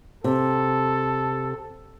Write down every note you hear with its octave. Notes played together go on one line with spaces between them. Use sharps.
C3 A4